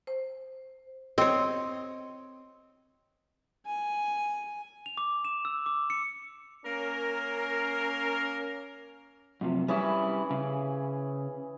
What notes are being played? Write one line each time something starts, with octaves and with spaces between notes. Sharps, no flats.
C5
C4 C#5 D#5
G#5
F7
D6
E7
E6
D6
C#7
A#3 C#4 A#4
F#2 C3 F3
E3 G3 C#4 E4 G#4
C#3